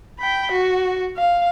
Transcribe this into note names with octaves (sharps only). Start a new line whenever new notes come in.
G5 B5
F#4
F5